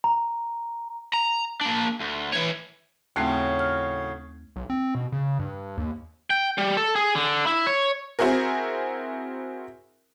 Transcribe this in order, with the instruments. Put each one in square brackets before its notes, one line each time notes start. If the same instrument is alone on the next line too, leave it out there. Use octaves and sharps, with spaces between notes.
[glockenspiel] A#5
[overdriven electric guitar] A#5
A#3 D4
D2
E3 C#5
[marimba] D#2 A3 C4 [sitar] A2 C#3 F#3
[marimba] F6
[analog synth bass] B1
C4
B2
C#3
G2
D#2
[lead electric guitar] G5
G3
A4
G#4
D3
E4
C#5
[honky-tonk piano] C4 E4 F#4 G#4 A#4